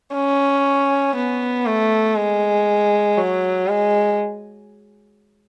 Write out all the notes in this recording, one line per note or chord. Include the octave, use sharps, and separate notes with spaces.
C#4
B3
A3
G#3
F#3
G#3